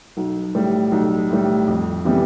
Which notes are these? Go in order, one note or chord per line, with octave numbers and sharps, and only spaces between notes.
B1
A2 G3
B1
A2 G3
F2
C3 E3 G3 B3